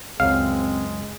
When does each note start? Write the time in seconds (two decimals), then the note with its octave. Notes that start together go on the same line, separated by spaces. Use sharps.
0.20 C#2 F#2 G#3 C4 F5